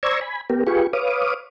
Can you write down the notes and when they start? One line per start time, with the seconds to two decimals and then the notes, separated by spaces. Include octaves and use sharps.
0.03 C5 D5 A#5 C#6 E6 G#6
0.21 G#5 B5
0.50 B3 G4 A#4
0.67 F4 G4 G#4 B4 C#6
0.93 B4 C#5 F5 D6 D#6